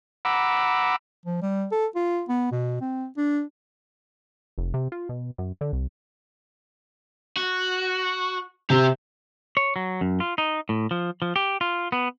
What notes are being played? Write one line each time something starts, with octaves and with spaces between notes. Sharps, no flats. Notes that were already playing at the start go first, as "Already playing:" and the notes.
F#5 A#5 B5 D6 E6
F3
G3
A4
F4
B3
B2
C4
D4
F1
C3
F4
B2
F#2
D3
C2
F#4
C3 G4 E5
C#5
F#3
F#2
F4
D#4
A2
F3
F3
G4
F4
B3